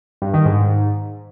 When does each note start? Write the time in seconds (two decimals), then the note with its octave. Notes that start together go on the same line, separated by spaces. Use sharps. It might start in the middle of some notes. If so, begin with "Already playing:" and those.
0.22 G2
0.34 D#3
0.45 G#2